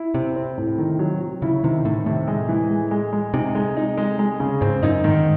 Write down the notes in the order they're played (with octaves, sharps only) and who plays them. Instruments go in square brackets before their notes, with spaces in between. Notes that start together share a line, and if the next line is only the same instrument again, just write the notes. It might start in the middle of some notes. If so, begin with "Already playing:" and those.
Already playing: [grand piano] E4
[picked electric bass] C3 [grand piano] C4
[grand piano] C4
A2
D#3
F#3
F#3
[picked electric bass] C#3 [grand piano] E4
[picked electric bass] C3 [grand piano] D#3
[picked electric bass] A2 [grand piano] D#3
[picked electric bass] A2 [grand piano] C3
[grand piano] G#3
E3
G#3
G#3
G#3
[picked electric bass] C3 [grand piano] D#4
[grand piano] G#3
D#4
G#3
G#3
C#3
[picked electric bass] G#2 [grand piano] C4
[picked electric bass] F#2 [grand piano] D#4
[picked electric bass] G#2 [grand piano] D#3